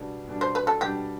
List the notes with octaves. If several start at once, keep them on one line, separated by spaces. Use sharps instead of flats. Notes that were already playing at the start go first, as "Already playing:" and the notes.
Already playing: B2 G3 D4
B2 G3 D4
C5
B4
A4
B2 G3 D4 G4